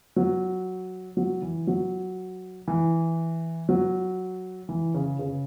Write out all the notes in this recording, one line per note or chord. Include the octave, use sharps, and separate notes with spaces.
F#3
F#3
E3
F#3
E3
F#3
E3
C#3
C#3